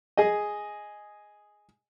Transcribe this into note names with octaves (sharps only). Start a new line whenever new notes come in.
G#4 D#5